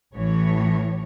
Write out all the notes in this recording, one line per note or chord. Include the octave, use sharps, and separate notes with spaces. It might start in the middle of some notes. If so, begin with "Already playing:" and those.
A1 A2 E3 C#5